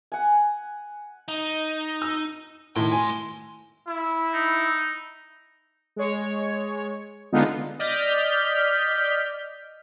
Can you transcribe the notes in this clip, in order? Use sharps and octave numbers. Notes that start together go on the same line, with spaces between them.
F#5 G#5
D#4
E6
A2 D#3 A3 C6
G#5
E4
D#4
G#3 C#5
D3 G#3 B3 D#4 F4
D5 D#5 F6 G6 B6